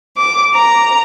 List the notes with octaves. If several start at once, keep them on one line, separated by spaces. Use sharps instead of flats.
D6
A#5